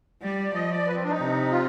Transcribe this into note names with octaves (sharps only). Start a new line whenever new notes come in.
G3 D5
F3 D#5
D5
B4
C4
D4
D#4
C3
F4